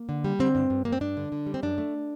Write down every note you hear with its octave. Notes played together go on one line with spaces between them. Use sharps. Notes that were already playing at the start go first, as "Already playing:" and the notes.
Already playing: A#3
D3
G3
D3 C4
G2
G2
G2 A#3
C4
G2 D4
D3
D3
G3
C4
F#2 D4
A3